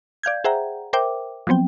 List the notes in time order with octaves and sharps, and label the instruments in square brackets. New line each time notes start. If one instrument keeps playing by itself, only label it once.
[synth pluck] D5 F5 G6 G#6
G#4 C5 E5 F#5 G5 A#5
A#4 C5 E5 G5 D6
F3 F#3 B3 C4 G5